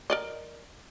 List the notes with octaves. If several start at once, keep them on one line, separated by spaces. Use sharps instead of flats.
A#4 D5 D#5